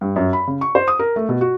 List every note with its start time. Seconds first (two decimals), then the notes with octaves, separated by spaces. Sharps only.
0.01 G2
0.16 F#2
0.33 B5
0.47 C#3
0.61 C#6
0.75 C5
0.88 D#6
0.99 A#4
1.16 A3
1.29 B2
1.41 F#4